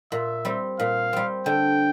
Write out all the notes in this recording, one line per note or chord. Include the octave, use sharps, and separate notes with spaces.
A#2 E5
G3 C4
A#2 F5
G3 C4
D3 G5